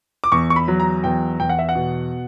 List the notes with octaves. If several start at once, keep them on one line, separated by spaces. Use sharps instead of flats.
D6
E2 C#6
C#6
B5
F#3
A#5
E2 G5
E2 G5
F#5
E5
F#5
B2